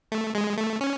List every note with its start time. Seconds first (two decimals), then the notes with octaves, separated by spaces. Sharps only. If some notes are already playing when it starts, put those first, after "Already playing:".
0.12 A3
0.35 G#3
0.58 A3
0.81 C#4